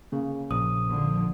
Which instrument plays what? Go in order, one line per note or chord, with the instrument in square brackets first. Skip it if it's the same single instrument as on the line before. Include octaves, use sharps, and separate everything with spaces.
[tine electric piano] C#3 A#3
[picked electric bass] A#1 [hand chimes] D#6
[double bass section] D3 F3